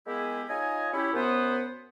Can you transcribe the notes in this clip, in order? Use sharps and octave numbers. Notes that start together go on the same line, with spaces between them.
G#3 A#3 B3 E4 G4 G#4
D#4 F4 C#5 D#5 G#5
C#4 E4 G4
F#2 B3 C5